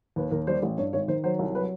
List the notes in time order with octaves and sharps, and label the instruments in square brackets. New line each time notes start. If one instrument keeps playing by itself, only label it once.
[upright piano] D#2 B4
D#2 A#4
G3 C5
A1
G2 C#5
G#1 C#5
D#3 C5
F#3 C5
C2
F#3 B4